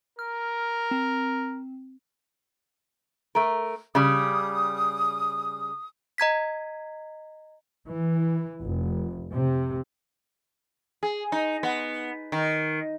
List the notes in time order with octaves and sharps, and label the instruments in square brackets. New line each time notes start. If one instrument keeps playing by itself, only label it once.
[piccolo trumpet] A#4 [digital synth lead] F6
[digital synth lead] C4
[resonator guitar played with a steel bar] A3 A#4
[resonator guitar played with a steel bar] C#3 G3 [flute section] D#6
[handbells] D#5 A#5 G#6 B6
[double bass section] E3
F1
C3
[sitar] G#4
D#4
B3
D#3